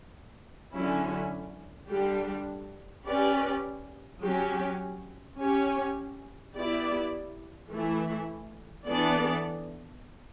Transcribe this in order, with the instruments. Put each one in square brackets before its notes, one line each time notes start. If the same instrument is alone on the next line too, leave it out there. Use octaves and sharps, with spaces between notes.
[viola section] D3 F#3 C#4 E4
D3 G3 D4 G4
C#4 G4 B4 D5
F#3 C#4 G4
C#4 G4 C#5
B3 E4 G4 D5
E3 A3 E4
E3 B3 D4 A4 D5